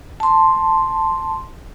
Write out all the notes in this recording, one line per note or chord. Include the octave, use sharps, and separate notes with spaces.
A5 C6